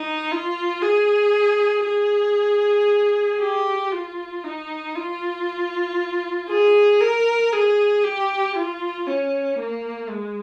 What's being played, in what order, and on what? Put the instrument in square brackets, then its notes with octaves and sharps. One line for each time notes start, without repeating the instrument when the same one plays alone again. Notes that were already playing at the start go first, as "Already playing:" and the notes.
Already playing: [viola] D#4
F4
G#4
G#4
G4
F4
D#4
F4
G#4
A#4
G#4
G4
F4
C#4
A#3
G#3